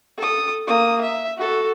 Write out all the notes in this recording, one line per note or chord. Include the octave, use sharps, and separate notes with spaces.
A4 D#6
A#3 D#6
E5
F#4 A4